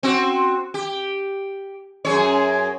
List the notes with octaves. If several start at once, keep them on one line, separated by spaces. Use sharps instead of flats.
C4 F#4
G4
F#2 G#4 C#5